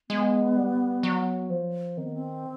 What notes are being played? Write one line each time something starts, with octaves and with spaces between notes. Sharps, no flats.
G#3 B3
G3
F#3
F3
D#3 C4
B3
C4